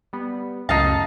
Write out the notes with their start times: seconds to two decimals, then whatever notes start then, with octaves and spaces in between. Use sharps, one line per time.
0.13 G3 B3
0.69 C#2 F#2 A2 D#4 F4 A5